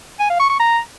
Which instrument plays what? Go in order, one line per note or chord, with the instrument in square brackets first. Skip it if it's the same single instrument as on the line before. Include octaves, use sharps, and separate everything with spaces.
[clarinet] G#5
F5
C#6
C#6
A#5